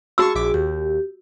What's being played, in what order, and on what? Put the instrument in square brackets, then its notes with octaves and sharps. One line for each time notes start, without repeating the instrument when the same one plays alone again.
[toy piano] F#4 E6 [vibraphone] G#4 [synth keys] F5 A5 C#6
[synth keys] A#1 E5 D6
[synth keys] D#2 [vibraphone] G4